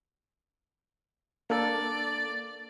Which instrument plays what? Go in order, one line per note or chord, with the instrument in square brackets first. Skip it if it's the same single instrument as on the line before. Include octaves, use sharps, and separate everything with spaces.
[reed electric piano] A#3 D4 A4 [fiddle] D5